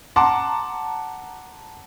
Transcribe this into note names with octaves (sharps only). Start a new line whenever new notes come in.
F#5 A5 A#5 C6 D6